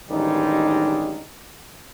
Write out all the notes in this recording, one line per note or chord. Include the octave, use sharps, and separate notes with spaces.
A1 D#3 G3 G#3 D4 D#4